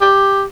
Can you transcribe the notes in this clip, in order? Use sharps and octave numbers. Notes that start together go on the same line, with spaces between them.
G4